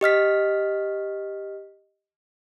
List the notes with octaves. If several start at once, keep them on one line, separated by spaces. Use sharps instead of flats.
G4 D#5 F6 B6